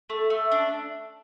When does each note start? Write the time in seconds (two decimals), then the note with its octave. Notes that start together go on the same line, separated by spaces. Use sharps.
0.10 A3
0.30 A3
0.51 D4